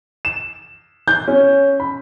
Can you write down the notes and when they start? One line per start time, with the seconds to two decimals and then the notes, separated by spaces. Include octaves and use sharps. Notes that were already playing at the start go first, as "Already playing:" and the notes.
0.25 E7
1.08 G6
1.28 C#4
1.80 B5